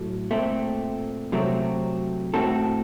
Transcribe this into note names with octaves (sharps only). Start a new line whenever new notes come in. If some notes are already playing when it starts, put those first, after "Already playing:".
Already playing: A2 F#3 A4
A#2 A3 C4
C3 F#3 A3 C4
A2 A3 C4 F#4 A4